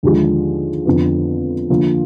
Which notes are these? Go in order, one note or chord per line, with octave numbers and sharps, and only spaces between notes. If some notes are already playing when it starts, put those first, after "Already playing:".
D#2 D3 F3 G#3
F2 D3 F3 B3
D3 F3 A#3 F4